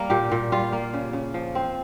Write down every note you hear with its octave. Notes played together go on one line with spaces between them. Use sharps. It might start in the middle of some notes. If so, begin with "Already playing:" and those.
Already playing: G3 A#3 A#4
A#2 G4
A#2
G3 F4
A#3
C#3
C#3
F3
C4